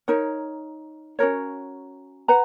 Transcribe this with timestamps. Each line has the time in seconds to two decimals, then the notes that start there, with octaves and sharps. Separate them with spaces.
0.08 D#4 A#4 C#5
1.19 C#4 F#4 A#4 C#5
2.28 B4 F#5 A#5